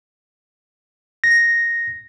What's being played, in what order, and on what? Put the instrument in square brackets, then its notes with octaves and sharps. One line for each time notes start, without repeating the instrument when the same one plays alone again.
[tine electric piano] A#6